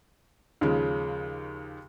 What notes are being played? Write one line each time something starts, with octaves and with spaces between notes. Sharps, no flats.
D#2 C#3 F3 G#3